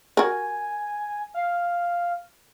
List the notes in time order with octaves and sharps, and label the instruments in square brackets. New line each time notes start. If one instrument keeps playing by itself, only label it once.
[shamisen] F#4 A#4 [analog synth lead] G#5
[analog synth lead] F5